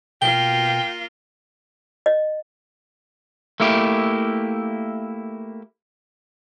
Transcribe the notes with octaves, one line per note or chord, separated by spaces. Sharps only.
B2 A#3 F4 G5 G7
D#5
A3 A#3 E4 G4